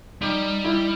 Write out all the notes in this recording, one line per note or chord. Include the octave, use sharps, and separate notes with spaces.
G3 D#4
E4